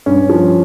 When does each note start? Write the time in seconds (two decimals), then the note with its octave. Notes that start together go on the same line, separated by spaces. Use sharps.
0.06 G2 C#4
0.29 F3